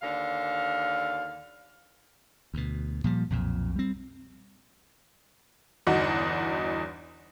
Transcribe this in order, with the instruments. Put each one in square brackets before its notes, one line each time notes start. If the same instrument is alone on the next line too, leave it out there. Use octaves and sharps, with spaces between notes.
[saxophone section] D#2 D3 F5
[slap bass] D2 B2
A#2 F3 G3
B1 F2 A#2
G3 C4
[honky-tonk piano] G1 E2 D#4 F#4 F#5